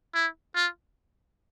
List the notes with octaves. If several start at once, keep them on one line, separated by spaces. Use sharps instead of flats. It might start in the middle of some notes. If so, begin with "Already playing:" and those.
E4
F4